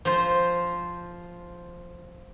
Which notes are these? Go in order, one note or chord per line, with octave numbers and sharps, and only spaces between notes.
F3 C5